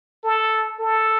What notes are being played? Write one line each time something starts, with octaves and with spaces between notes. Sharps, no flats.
A4
A4